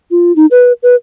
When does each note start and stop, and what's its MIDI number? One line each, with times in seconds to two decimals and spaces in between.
0.11 0.35 65
0.36 0.46 63
0.51 0.73 71
0.83 0.95 71